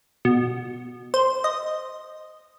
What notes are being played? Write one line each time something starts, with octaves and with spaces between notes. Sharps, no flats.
B2
C5
D#5